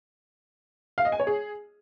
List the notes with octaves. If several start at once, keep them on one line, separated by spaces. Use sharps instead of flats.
F5
D#5
G#5
C#5
G#4